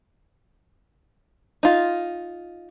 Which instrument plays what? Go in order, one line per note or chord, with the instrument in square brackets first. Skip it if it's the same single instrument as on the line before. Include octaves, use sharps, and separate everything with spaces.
[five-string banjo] D#4 F4